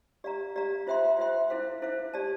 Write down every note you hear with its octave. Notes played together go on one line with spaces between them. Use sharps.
G4 D5 F5 A#5
G4 D5 F5 A#5
F4 C5 E5 G5 C6
F4 C5 E5 G5 C6
E4 A4 C5 F5
E4 A4 C5 F5
G4 D5 A5